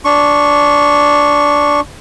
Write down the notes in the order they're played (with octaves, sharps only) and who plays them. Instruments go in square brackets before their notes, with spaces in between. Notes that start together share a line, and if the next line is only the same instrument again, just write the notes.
[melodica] D4 C#6